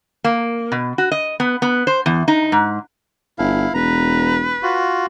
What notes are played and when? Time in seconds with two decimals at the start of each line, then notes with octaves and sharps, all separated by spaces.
0.24 A#3
0.72 B2
0.98 F#4
1.12 D#5
1.40 B3
1.62 B3
1.87 C5
2.06 E2
2.28 D#4
2.52 G#2
3.39 G1 E4 F5
3.74 E1 B4 A#5
4.63 F4 F#4